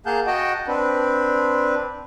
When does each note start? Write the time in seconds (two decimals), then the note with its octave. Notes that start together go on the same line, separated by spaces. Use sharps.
0.06 A#3 G#4 F5 F#5 A5 G6
0.27 F#4 D#5 F#5 G5 A5
0.68 C4 D4 B4